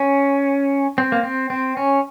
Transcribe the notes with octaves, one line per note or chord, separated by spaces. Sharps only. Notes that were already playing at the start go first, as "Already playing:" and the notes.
Already playing: C#4
C4
A#3
C4
C4
C#4